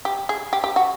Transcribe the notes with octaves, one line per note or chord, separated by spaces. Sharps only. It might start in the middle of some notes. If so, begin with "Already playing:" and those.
G4
G#4
G4
G4
F#4